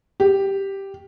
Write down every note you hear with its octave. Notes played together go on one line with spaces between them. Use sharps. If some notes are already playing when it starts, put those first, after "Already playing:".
G4